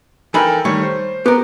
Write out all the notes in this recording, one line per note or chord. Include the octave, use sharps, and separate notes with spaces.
E3 D#4 A4 A#4 G5 B5
D#3 G3 A3 C#5
C5
B3 G4 A#4